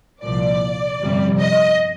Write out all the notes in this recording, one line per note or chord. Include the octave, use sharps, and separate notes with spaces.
C2 A#2 F3 D5
G1 F2 C3 G3
D#5